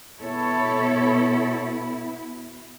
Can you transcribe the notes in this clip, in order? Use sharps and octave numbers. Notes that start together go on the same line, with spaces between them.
B2 B3 E4 A4 C#5